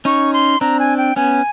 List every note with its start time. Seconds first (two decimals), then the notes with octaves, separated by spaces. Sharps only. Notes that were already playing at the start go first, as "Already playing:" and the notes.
0.05 C#4 D#4 C#6
0.33 C6
0.61 C4 D4 A#5
0.80 G#5
0.98 G5
1.16 B3 C#4 G#5